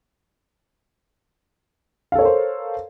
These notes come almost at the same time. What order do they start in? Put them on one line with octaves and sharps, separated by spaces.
F5 A4 C#5 A#4 C5